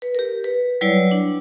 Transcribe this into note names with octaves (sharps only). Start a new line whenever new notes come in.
B4
G4 A#4
B4
F#3 G3 E4 B4 C#5 D5
D4